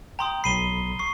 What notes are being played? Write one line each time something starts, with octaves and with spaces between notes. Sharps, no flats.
G5 A#5 C6 D#6
B1 B5 C7 D#7 G7
C#6 C7